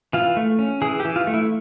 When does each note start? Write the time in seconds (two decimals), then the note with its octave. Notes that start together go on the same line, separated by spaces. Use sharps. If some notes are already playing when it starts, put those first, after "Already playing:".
0.13 E3 F4
0.37 A3
0.59 C#4
0.82 E3 G#4
1.00 G4
1.05 E3
1.16 F4
1.27 A3
1.34 E4